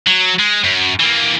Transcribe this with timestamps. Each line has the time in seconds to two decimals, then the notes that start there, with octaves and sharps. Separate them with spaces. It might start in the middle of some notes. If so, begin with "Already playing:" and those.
0.07 F#3
0.39 G#3
0.64 F#2
1.00 E3 A#3